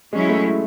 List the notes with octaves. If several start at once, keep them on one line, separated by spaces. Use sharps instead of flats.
F#3 G#3 C#4 E4
A3
G#3